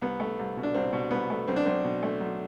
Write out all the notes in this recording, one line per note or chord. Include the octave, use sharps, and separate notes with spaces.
C2 B3
A3
C2
B2
D4
C2 C4
B2
C2 B3
A3
B1 C4
D4
B1 C4
B2
A3
B1